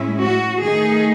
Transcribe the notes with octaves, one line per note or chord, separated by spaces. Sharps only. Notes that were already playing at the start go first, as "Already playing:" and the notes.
Already playing: A2 G#3 C#4 E4
F#4
D#3 A3 D#4 G#4